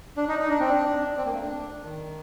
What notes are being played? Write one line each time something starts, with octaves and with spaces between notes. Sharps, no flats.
D4
D#4
D#4
D4
C4
D4
C4
A#3
A3
D4
D#3